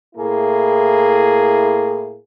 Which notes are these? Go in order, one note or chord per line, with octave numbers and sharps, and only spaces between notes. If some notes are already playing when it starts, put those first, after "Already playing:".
A2 A#3 E4 G#4